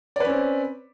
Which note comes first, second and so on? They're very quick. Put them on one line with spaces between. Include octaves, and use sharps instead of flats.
D5 B4 C#4 C4